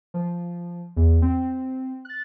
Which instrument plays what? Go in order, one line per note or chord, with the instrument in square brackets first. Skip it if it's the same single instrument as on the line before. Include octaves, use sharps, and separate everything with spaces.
[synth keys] F3
E2
C4
F#6 A6